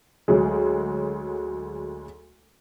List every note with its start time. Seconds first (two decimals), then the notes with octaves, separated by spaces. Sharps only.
0.28 D2 F#3 G#3